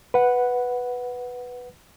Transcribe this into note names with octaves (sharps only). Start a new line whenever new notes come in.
B4 F#5